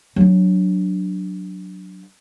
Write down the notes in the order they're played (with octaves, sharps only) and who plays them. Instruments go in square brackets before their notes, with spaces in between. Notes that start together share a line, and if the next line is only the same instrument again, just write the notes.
[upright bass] F#3 D4